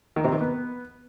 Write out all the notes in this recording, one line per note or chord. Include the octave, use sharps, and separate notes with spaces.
D#3
C3
D#3
B3